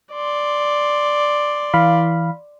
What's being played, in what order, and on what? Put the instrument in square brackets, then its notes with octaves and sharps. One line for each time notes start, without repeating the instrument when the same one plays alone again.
[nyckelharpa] D5 C6
[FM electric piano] E3 F5 B5